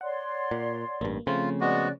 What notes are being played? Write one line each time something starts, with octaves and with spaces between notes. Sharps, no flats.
C#5 D5 F#5 C6
A#2
A1 G2 A#3
C#3 F3 A3 C4 F4
G#3 B3 F#4 D5 D6 F#6